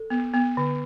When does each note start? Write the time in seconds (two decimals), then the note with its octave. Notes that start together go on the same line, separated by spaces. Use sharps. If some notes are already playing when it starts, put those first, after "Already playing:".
Already playing: A4
0.10 B3
0.34 B3
0.57 D3